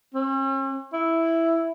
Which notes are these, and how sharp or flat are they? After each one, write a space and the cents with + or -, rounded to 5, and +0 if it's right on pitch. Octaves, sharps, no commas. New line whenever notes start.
C#4 -45
E4 +0